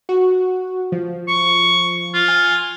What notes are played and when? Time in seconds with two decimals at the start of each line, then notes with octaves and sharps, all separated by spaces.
0.09 F#4
0.92 F3
1.28 C#6
2.14 F4
2.28 G#5